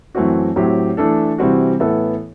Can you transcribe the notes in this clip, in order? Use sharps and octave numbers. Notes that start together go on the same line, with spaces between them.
F#2 E3 A3 C4 F#4
A2 F#3 C4 G4
E3 A3 D4 A4
C3 E3 G3 C4 F#4
A2 E3 B3 E4 A4